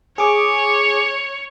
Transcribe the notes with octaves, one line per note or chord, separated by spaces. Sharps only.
G#4 C#5 D6